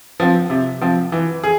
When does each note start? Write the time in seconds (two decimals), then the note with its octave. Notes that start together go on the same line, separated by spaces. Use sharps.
0.20 F3 C4
0.50 C3
0.81 F3 C4
1.12 E3
1.43 G#4